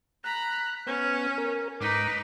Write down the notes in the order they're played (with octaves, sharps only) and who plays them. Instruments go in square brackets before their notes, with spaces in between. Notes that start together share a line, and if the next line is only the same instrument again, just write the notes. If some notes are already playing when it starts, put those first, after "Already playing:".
[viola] A#5 B5 [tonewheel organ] F#6
[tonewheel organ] B3 [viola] C#4
[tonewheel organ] A#4
[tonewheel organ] G#2 D6 [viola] D#4 B4